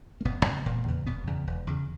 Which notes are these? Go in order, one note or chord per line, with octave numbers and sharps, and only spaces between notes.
A#3
E1 B2 B3
E2 C#3
E1 A#2 A#3
E2 C#3
E1 B2 B3
E2 C#3
E1
E2 C#3